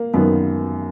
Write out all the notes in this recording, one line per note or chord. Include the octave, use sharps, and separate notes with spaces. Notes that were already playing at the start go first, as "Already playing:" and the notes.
Already playing: A#3
F#2 D#3 B3